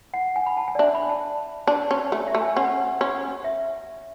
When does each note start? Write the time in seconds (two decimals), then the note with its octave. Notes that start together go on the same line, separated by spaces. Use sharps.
0.14 F#5
0.36 G#5
0.46 B5
0.57 A5
0.68 G#5
0.75 D5
0.79 D4 E5
0.95 B5
1.09 A5
1.67 D4 A5
1.91 C#4
2.12 A3
2.28 E5
2.35 A3
2.41 G#5
2.57 C#4 F#5
3.01 C#4
3.44 E5